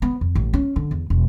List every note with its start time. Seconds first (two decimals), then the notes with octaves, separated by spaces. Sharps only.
0.02 B3
0.21 F2
0.35 A1
0.53 C#4
0.76 D3
0.91 E2
1.10 E1